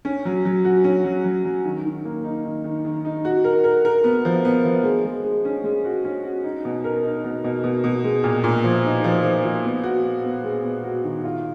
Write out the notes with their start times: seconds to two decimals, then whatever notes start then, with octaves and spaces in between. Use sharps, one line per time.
0.05 C#4
0.25 F#3
0.45 F#3
0.65 F#4
0.84 C#4
1.04 F#3
1.24 F#3
1.45 F#3
1.65 D#3
1.85 D#3
2.05 A#3
2.24 D#4
2.45 D#3
2.64 D#3
2.85 D#3
3.05 D#4
3.25 F#4
3.44 A#4
3.64 A#4
3.85 A#4
4.04 B3
4.25 F3
4.45 B3
4.65 F3
4.84 G#3
5.05 G#3
5.25 G#3
5.45 C#4
5.64 G#3
5.85 F#4
6.04 C#4
6.24 F#4
6.44 D#4
6.65 B2
6.84 A#4
7.04 D#4
7.24 B2
7.44 B2
7.64 B2
7.84 B2
8.04 G#3
8.24 A#2
8.44 A#2
8.64 F3
8.85 D#4
9.04 F3
9.24 F3
9.44 F3
9.64 B3
9.83 F#4
10.04 B3
10.24 B3
10.44 G#3
10.63 B3
10.84 F#4
11.04 D#3
11.24 F4